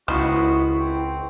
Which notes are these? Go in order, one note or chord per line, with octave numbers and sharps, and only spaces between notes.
C#2 D#3 B3 E4 F#4 C5
C4